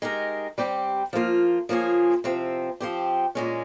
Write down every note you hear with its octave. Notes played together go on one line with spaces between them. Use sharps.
G#3 D#4 G4 A#4
G3 C4 G4
F3 A#3 F4
F3 A#3 C#4 F4 G#4
C3 F3 C4
F3 C4 G4
A#2 G#3 C#4